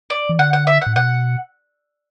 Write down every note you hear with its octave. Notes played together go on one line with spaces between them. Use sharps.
D5
E3
D3 F#5
F#5
E5
F#5
A2
B2 F#5